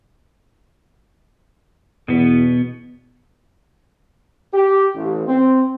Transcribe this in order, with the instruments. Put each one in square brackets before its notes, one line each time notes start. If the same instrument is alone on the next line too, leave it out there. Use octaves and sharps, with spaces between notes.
[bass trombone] E2 [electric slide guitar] B2 B3
[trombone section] G4
A1
C4